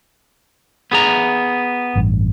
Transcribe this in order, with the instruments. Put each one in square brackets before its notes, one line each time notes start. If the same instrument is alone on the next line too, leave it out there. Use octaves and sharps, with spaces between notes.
[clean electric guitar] B3 G#4 A#5
[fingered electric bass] A1 G2